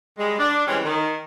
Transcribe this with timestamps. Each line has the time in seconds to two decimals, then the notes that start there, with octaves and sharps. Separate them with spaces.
0.18 G3 G#3
0.39 D4
0.67 E3 G3 G#3 C4 C#4
0.85 D#3